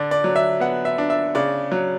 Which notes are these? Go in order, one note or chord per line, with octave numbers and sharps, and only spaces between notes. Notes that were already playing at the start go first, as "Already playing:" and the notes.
Already playing: D3 D5
D5
F#3
E5
B3 F#5
E5
D4
E5
C#3 D5
F#3